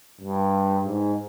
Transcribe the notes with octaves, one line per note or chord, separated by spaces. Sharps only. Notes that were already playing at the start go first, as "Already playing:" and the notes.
G2
G#2